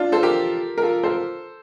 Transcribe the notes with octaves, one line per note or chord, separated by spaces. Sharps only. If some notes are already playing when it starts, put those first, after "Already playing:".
Already playing: D4 F4
A4 C5
G4 A#4
A#4
F4 A4
A4 C5